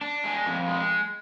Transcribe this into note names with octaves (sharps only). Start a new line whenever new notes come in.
D4
G#3
F2
G#3